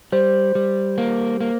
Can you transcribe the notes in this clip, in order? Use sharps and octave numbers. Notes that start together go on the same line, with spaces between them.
G3 C5
G3
A#3
A#3